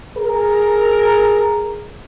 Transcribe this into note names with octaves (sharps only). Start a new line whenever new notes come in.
G#4 A#4